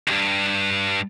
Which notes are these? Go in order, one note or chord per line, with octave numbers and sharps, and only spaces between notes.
C#2 G2